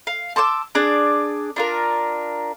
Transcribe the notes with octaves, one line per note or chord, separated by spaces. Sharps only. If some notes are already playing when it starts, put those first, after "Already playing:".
F5
A5 C6 D6 E6
D4 G#4 D5
D4 F4 A#4